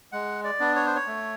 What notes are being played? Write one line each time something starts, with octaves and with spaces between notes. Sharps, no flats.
G#3 F#5
D5
B3 D4
C#5
C5
C#5
A3